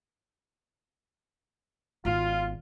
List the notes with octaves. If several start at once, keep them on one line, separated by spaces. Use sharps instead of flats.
G#1 B3 F4